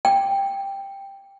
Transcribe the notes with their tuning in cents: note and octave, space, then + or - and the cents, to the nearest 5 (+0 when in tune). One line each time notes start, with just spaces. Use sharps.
G5 +10